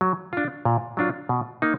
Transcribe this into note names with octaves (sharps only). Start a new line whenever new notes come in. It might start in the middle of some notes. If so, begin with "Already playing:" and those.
F#3
D4 F4
A#2
F#3 D4 F4
B2
A#3 D#4